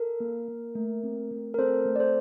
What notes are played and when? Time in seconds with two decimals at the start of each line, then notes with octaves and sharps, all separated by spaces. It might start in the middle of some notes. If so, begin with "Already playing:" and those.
Already playing: A4 A#4
0.20 A#3
0.48 A#3
0.75 A3
1.03 C4
1.31 A3
1.54 A#4
1.58 C4 A4 C5
1.86 A3
1.96 D5
1.99 A4 C5